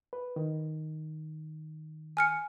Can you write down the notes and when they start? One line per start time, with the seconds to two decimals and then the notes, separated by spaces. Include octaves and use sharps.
0.13 B4
0.36 D#3
2.17 G#5 F6 C#7